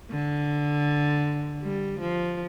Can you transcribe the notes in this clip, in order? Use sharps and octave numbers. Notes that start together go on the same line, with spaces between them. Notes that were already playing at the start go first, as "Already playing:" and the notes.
D3
G3
F3